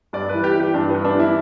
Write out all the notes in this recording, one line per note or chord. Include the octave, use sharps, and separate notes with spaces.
G2 D5
B4
E3
G4
E3
G4
G2 D4
G2 B3
D4
E3 E4